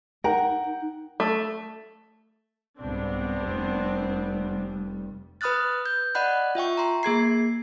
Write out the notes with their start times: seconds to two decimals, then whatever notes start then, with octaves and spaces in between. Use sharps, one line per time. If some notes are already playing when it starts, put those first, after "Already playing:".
0.24 D#4 A#4 F#5 G5
1.20 A3
2.80 C2 G#2 B3 C4 D4
3.43 F1 G3
5.41 B4 B5 D#6 F6 F#6 A6
5.86 G6
6.15 D5 D#5 F#5 B5 F#6
6.55 F4 E5 G5 C#6
6.77 A#5 C6
7.03 A#3 G#4 G#6 C7